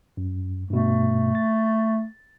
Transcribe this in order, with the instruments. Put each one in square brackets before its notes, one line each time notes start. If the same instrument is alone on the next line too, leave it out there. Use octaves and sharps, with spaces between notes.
[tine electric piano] F#2
[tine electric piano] G2 B2 [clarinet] A3
[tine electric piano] A6